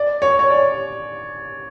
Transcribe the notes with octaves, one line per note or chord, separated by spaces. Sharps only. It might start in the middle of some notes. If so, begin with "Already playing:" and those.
Already playing: D5
C#5
C#5
D5